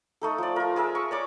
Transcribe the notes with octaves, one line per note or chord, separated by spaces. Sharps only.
A3 D#4 A4
F3 D5
F4 A#4
G#4 A#4 E5
C#6
C#5 D5 D6